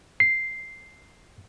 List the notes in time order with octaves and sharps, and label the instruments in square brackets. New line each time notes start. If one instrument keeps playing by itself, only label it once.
[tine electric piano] C7